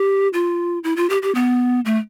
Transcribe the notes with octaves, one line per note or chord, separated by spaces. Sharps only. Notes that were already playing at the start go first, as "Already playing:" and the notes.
Already playing: G4
F4
E4
F4
G4
G4
B3
A3